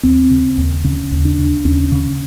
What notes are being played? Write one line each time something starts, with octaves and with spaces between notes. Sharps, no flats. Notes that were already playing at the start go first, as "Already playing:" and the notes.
D#2 C4
C#3
D#2
C#3 C#4
D#2
D4
C#3
D#2 C#4
C#3